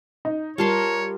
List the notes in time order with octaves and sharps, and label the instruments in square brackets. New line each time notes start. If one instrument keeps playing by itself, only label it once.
[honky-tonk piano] D#4
[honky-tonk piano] G3 [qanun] F4 A5 C6 [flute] A#4 [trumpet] C#5